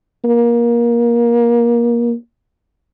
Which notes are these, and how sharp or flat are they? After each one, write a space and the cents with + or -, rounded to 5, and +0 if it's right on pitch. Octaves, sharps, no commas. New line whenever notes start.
A#3 +25